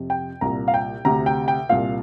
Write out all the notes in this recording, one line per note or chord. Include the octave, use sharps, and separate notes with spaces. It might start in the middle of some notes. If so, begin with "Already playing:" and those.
Already playing: F2 C3
G5
C2 A#2 A#5
F5
G5
D2 C3 A#5
G5
G5
C2 A#2 F5